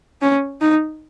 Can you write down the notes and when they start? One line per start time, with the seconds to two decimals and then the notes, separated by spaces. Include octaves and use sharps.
0.22 C#4
0.61 D#4